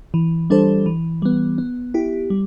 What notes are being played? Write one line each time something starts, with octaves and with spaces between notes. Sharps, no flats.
E3
G3 D4 A4 C5
E3
G3 B3
B3
E4 G4
G3